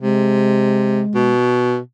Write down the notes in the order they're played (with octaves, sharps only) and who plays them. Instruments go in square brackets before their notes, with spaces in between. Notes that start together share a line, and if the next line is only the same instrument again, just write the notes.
[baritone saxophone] C3 [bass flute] G#3
[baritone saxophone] B2